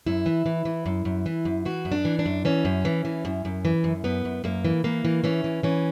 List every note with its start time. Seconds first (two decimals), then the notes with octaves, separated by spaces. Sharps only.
0.06 F#2 E4
0.26 E3
0.46 E3
0.65 E3
0.86 F#2
1.05 F#2
1.26 E3
1.45 F#2
1.65 E3 F#4
1.85 F#2
1.92 D4
2.05 E3
2.19 D4
2.26 F#2
2.45 E3 C#4
2.65 F#2
2.85 E3
3.05 E3
3.25 F#2
3.45 F#2
3.65 E3
3.84 F#2
4.04 F#2 B3
4.25 F#2
4.44 F#2 A#3
4.65 E3
4.84 E3 A#3
5.05 E3
5.24 E3 C#4
5.44 E3
5.63 E3 C#4